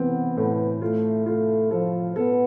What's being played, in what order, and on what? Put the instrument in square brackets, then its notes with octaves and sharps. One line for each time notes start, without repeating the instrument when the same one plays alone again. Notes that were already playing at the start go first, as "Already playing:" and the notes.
Already playing: [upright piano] E3 C4 [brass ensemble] B3
[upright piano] A2
[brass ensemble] A3 [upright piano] F4
[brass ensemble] A3 [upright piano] F4
[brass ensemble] F3 [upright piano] A4
[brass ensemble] B3 [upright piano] A4